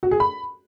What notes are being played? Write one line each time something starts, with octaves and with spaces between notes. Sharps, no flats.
F#4
G#4
B5